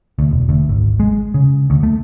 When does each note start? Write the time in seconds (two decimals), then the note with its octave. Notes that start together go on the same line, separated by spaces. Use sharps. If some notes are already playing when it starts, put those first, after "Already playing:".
0.19 D2
0.31 E1
0.49 D2
0.69 G#1
1.00 G#3
1.34 C#3
1.70 D2
1.83 A3